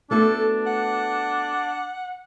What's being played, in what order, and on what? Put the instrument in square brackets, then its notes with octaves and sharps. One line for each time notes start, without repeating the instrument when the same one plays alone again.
[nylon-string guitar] A3 B3 F#4 [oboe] D4 [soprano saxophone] A4
[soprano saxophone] F#5